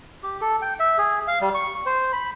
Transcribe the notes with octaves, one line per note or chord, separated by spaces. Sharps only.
G4
A4
G5
E5
G#4
F5
G3
C#6
C5
B5